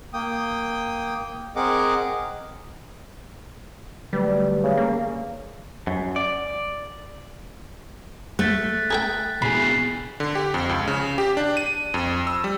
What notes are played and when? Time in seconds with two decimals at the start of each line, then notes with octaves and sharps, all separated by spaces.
0.13 A#3 G5 D#6
1.56 C4 G#4 A#4 D#5 F#5 D6
4.13 D3 F#3 G3 A3 B4 D5
4.64 C#3
4.77 A#3
5.87 F#2
6.16 D5
8.39 A3 F#6 A6 B6
8.91 G#4 A4 G5
9.42 B2 G#4 B5 C7
10.20 D3
10.35 G4
10.54 F2
10.69 C#2
10.87 C#3
11.18 G4
11.37 D4
11.57 D#7
11.94 F2
12.27 E6
12.44 G3